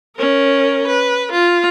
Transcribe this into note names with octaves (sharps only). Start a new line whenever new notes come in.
C#4 A#4
B4
F4